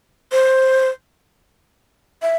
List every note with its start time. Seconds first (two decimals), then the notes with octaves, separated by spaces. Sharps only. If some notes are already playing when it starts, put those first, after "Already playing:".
0.32 C5
2.22 E5